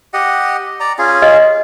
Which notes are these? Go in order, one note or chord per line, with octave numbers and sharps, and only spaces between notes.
G4 D#5 F#5
D5 A#5
C#4 F4 G#4
D#5